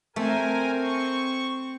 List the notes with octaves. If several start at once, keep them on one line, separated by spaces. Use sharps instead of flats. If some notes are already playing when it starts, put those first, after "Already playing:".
A3 C4 A#4 G#5
C#6